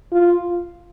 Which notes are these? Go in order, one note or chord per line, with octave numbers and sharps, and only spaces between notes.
F4